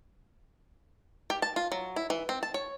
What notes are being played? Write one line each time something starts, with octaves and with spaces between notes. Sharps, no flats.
G4
A5
F4
F#3
E4
E3
C4
A5
C#5